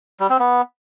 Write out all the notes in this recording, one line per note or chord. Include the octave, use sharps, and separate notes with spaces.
G3
C4
B3